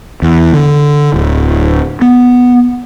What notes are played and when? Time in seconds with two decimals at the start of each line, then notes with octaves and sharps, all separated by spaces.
0.22 E2
0.53 D3
1.14 D1
2.02 B3